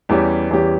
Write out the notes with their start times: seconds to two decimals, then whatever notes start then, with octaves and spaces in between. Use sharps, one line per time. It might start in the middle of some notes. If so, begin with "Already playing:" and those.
0.09 E2 E3 G3 C#4 G4
0.50 E2 E3 G3 C#4 G4